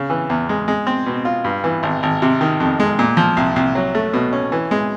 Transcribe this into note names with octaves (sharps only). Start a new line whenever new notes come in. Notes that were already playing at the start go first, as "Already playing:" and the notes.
Already playing: C#3
E3
E2
G#3
G#3
C4
B2
F4
G2
E3
G#1
G#1
C3
D#3
F2
G#3
A#2
F3
C2
C2
F#3
A3
B2
C#4
E3
G#3